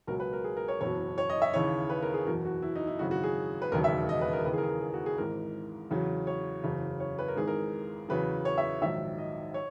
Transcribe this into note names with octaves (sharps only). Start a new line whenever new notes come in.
C#2 B2 F#3 A#4
B4
A#4
G#4
A#4
C#5
F#1 E2 B2 F#3 C#5
C#5
D#5
E5
D#2 C#3 E3 C#5
B4
A#4
G#4
F#1 E2 B2 F#3 A#4
F#4
E4
D#4
E4
G#1 F#2 C#3 E3 F#4
F#4
G#4
B4
E1 D#2 C#3 F#3 A#4
E5
D#5
B4
A#4
D#2 C#3 E3 B4
G#4
A#4
G#4
A#4
G#4
F#4
G#4
G#1 G#2 E3 A#4
E2 C#3 F#3
C#5
F#1 E2 C#3 F#3
C#5
B4
A#4
G#1 G#2 E3 G#4
A#4
E2 C#3 F#3 B4
C#5
E5
A#1 G#2 D#3 F#3 E5
D#5
C#5